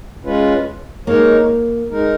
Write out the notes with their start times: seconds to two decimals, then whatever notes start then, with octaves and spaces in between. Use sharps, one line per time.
0.25 G#3 C#4 F4 B4
1.07 G#3 A#3 D#4 A#4 C#5
1.90 G#3 D#4 A#4